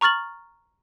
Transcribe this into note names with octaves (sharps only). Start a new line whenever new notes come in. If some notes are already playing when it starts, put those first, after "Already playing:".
A#5 C#6 F6 A6 F#7